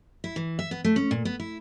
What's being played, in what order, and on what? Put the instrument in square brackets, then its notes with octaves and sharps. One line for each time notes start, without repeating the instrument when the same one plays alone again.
[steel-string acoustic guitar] E4
E3
E5
B3
A3
C#4
A#2
B3
E4